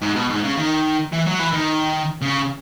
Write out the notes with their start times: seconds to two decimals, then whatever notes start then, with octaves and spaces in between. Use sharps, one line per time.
0.01 G#2
0.16 B2
0.30 G#2
0.43 C#3
0.57 D#3
1.12 E3
1.26 F#3
1.39 E3
1.53 D#3
2.22 C#3